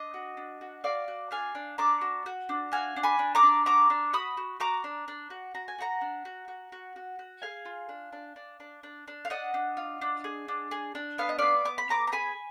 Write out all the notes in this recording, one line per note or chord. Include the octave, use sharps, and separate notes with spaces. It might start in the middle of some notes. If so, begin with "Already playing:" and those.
Already playing: D4 D#5
F#4
D4
F#4
F#4 D5 F5
F#4
D4 F5 G#5
D4
D4 A#5 D6
F#4
F#4
D4
F#4 F5 G#5
D4
G#5 B5
D4
A#5 D6
D4
F#4 A#5 D6
D4
F#4 B5 D#6
F#4
F#4 A#5 D6
D4
D4
F#4
F#4 A#5
G#5
F#4 F#5 A#5
D4
F#4
F#4
F#4
F#4
F#4
G#4 F5 G#5
F4
D4
D4
D4
D4
D4
D4
F5
D4 D#5 F#5
D4
F4
D4
G#4
D4
G#4
D4
B3 F5
D#5
B3 D5 F5
B3 D6
B5
B3 A#5 D6
A#5
G#4 G#5 B5